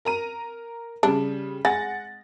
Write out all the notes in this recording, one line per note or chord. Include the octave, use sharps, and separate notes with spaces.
A#4 A#5 D#7
C#3 G3 D4
G#3 F#5 A6 A#6